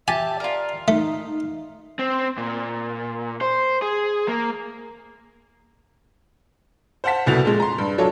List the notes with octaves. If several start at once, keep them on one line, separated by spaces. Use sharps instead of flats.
G4 E5 G#5 A5
F4 A#4 D5
A3 D#4
C4
A#2
C5
G#4
A#3
C5 F5 F#5 A5 B6
F1 C2 B2 F#4 A6 F7
A#2 F3 G#3
A#5 C6
G2
F#3 D4 F4 A4 C#5